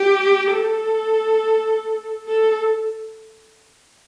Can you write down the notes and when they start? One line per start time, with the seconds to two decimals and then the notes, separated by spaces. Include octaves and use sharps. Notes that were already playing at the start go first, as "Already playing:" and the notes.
Already playing: G4
0.51 A4
2.28 A4